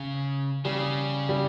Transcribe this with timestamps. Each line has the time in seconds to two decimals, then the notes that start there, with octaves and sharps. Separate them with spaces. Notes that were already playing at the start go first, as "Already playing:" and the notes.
Already playing: C#3
0.65 C#3 G3
1.29 G3